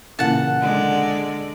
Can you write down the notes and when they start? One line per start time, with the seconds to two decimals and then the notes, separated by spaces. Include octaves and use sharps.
0.19 A#2 C#3 E3 F#5 A5
0.60 D3 G#3 D5